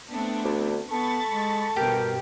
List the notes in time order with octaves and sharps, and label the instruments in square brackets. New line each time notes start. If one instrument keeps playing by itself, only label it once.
[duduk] A3 [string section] B3 C4 D4
[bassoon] D2
[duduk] B3 [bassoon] A4 [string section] B5 C#6 A6
[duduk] G#3
[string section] G2 B2 [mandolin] G4 [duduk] A#4